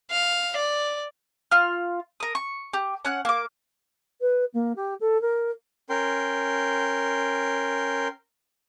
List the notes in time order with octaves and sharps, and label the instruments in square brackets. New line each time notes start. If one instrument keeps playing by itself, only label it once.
[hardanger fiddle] F5
D5
[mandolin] F4 F6
A#4 D#6
C#6
G4
C#4 F#5 F#6
A#3 D6
[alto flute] B4
A#3
G4
A4
A#4
[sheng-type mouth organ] C#4 A#4 G5 C6